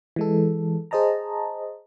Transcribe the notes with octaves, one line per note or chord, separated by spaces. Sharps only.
E3 G#3 A4
G#4 C5 D#5 A5 A#5